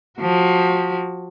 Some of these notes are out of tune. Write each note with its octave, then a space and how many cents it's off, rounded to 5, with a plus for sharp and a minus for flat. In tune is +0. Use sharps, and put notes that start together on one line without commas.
F3 +25 F#4 +25